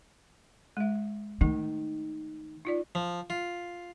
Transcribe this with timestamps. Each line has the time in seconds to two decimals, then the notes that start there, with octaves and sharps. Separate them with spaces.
0.77 G#3 E5
1.41 D#3 A3 D#4
2.65 D#4 F4 D5
2.95 F3
3.30 F4